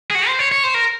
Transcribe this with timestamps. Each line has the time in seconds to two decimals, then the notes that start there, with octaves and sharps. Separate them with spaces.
0.11 G#4
0.15 F#4
0.27 C5
0.39 C#5
0.52 C#5
0.64 C5
0.74 A#4